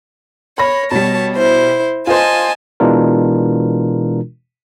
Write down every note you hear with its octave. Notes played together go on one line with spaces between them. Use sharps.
C#5 B5 A#6
B2 G3 C#5 A5
E4 C5
F4 C5 D#5 G#5 A5
B2 E3 G#3 D4 F4 A#4